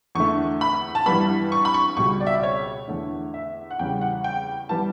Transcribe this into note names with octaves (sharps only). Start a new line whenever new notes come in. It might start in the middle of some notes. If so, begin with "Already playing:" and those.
E2 D3 A3 C#6
B5
A5
G2 E3 G3 B3 B5
C#6
B5
C#6
C#2 B2 G3 C#6
D5
E5
D5
C#5
E2 D3 A3
E5
F#5
E2 C#3 G3 G5
F#5
G5
E3 G3 B3 A5